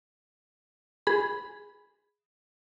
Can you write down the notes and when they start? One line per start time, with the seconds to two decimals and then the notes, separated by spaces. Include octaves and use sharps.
1.07 G#4 B5